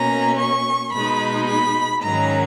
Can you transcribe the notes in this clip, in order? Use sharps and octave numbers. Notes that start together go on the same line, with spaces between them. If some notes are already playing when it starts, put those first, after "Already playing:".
Already playing: B2 A#3 C#4 A#5
C#6
B2 G#3 D#4 B5
B5
G#2 D#3 F#3 C#4 A#5